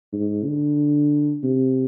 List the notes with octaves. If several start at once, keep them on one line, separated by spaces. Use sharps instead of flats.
G#2
D3
C3